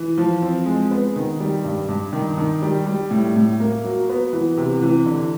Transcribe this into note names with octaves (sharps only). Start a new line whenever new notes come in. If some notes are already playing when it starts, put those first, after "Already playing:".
Already playing: E3
F3
C4
G#3
B3
D#3
G3
G2
G2
D#3
D#3
G3
G3
A2
A2
A#3
F#3
B3
E3
C3
E3
D3